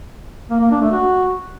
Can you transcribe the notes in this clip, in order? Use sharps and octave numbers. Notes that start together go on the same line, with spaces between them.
A#3
A#3
D4
A3
F#4